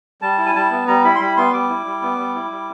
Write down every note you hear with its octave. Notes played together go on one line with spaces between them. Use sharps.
G3 A5
E4
G#5
G3 A5
B3
G3 A#5
E4 B5
C6
G3 B5
B3 C6
G3 D6
E4
G3
B3
G3
E4
G3